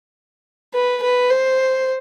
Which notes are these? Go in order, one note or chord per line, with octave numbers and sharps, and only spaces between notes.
B4
B4
C5